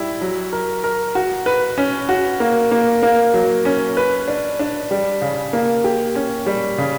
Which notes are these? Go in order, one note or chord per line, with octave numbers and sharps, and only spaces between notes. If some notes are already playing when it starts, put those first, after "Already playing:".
Already playing: G3 E4
F#3
A#4
A#4
F#4
B4
C#4
F#4
A#3
A#3
A#3
F#3
C#4
B4
D4
D4
G3
C#3
A#3
G4
C#4
G3
C#3